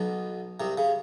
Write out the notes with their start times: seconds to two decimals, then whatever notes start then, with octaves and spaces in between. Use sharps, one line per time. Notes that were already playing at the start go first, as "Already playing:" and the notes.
Already playing: B1 B2
0.60 C2 C3
0.78 C#3